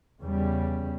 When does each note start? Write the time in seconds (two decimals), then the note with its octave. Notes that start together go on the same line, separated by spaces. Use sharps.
0.20 E2 C#3 G3